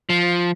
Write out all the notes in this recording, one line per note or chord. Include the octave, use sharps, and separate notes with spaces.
F3